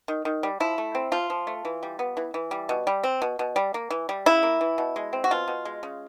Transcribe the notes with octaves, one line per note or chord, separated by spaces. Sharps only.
D#3
D#3
G3
F3 E4
A3
C4
F3 F4
F3
A3
E3
G3
B3
E3
E3
G3
B2
G3
C4
B2
B2
G3
A#3
E3
G3
C#3 E4
A#3
E3
B2
G#3
C4
F#4
B2 F4
B2
G#3
C#3